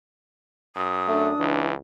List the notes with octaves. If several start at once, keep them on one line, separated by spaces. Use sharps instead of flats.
F#2 D#6
A3 D4
C#2 E3